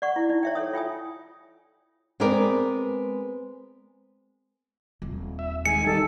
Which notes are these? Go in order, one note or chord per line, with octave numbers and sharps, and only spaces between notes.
D5 F#5 C#6
E4
D#4 D5
C#5 E5 G5
A4 C#5 D#6
F4 G5 G#5 D#6
G#3 B3 C4 A#4 B4 D5
D#1 C4
E5
D#3 G#3 G#5 C#7
D#3 G3 D#4 A4